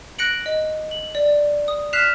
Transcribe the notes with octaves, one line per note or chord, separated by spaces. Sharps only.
F#6 A#6 C#7 D7 F#7
D#5
F#7
D5
D#6
F6 F#6 B6 C7 E7 F7